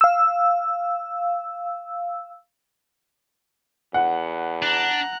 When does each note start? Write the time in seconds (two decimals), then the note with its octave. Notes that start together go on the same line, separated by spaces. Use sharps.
0.01 F5 E6
3.94 E2 F#5
4.62 D4 A#5 F#6